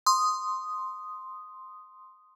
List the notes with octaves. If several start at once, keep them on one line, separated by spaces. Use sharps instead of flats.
C6 D#6